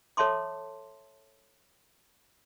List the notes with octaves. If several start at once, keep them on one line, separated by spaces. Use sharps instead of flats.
A4 C#5 E5 A5 C6 D6